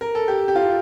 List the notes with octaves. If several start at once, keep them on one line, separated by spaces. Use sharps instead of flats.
A#4
A4
G4
G4
F4